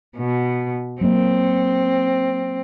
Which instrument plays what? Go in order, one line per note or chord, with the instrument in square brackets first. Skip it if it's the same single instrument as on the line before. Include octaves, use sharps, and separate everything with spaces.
[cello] B2
[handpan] F#3 A#3 [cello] C4